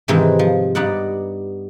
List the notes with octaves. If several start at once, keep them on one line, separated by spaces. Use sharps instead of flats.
G#2 C3 D#3 E3 C4
F3
G2 B3 D#4 D5 F#5